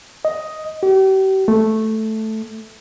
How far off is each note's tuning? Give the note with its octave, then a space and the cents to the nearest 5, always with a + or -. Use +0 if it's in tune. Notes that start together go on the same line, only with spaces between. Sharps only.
D#5 +5
G4 -40
A3 -5